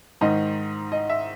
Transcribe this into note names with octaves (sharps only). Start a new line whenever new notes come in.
G#2 D#3 D#5
D#5
E5